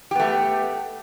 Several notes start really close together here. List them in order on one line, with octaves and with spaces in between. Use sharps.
G4 B3 A3